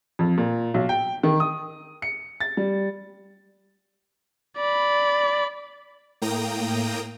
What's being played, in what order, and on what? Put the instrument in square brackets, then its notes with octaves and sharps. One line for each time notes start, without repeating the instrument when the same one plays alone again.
[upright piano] F2
A#2
B1
G5
D#3
D#6
C#7
A6
G3
[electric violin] D5 B5
[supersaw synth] A2 A#3 G5 A#5 D#6